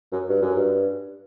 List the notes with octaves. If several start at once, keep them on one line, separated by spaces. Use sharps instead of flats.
F#2
G2
F#2
G2